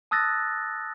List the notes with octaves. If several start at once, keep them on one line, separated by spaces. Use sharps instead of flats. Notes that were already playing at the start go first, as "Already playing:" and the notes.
A5 D#6 E6 F#6 A6 A#6